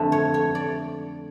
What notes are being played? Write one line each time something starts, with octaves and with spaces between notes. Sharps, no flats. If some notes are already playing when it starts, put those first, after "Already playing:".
Already playing: F2 D3 A3
C#5
C#5
D5